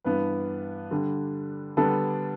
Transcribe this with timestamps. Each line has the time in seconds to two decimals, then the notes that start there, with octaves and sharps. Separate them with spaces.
0.05 G2 E3 B3 D4 B4
0.91 D3 G3 D4
1.77 D3 G3 B3 D4 A4